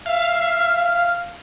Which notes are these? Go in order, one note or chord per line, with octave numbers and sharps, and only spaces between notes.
E5 F5